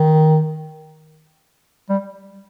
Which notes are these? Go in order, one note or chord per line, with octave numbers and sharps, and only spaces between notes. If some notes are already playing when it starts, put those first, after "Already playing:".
Already playing: D#3
G3